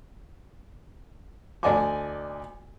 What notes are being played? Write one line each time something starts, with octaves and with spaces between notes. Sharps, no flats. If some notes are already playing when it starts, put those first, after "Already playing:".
D2 D5 D#5 G#5 A5 D6